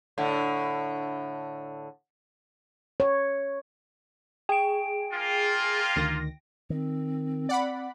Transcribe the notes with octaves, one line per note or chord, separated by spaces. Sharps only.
A2 D3
C#5
G#4 G5 D7
A#3 F4
D2 D#3 A#6
D#3 C4
D5 F#5 B5